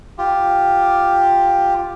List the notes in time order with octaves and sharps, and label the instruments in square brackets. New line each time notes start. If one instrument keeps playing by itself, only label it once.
[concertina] F4 G4